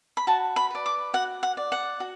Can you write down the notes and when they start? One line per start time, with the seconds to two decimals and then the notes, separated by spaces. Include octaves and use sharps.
0.17 B5
0.27 F#4 A5
0.56 B5
0.71 B4 D5
0.86 D6
1.14 F#4 F#5
1.43 F#5
1.57 D5
1.72 F#5
2.00 F#4